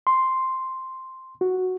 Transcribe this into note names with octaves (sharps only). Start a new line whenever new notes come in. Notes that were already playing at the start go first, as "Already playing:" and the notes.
C6
F#4